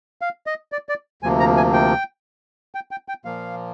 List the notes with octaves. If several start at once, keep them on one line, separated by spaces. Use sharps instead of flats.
F5
D#5
D5
D5
D2 C3 F3 A#3 G#5
A#5
G#5
G5
G5
G5
G5
A#2 F3 A#3 F5